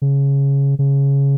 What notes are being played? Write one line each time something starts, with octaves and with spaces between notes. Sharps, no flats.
C#3
C#3